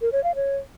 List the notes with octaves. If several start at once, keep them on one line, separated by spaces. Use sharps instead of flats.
A#4
C#5
F5
C#5